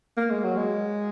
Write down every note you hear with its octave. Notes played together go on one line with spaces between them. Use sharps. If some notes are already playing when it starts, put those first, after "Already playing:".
A#3
G#3
F#3
G#3